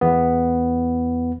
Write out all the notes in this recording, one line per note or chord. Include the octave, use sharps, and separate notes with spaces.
E2 B3